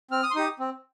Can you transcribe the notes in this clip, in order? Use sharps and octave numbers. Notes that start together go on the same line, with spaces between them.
C4 F6
D#6
C6
D#4 G4 D#6
C4